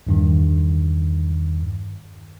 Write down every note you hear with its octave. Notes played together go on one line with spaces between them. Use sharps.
E2 G2 D#3